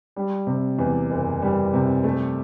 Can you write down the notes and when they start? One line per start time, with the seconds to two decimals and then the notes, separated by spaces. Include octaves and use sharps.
0.16 G3
0.47 C3
0.79 E2
1.10 F#1
1.42 G3
1.74 C3
2.04 A3